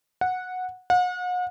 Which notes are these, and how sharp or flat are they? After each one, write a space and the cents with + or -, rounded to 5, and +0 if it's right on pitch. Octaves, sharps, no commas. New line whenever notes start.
F#5 -10
F#5 -40